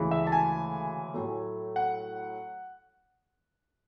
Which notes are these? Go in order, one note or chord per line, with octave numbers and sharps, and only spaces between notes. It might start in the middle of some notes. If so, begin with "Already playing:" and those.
Already playing: D2 C#3 E3 G#3
E5
A5
G#5
A2 F#3 A3
F#5